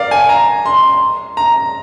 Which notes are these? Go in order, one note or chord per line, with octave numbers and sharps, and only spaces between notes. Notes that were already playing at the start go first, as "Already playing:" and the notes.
Already playing: A#4 D5 F5
G#5
A#5
C6
A#5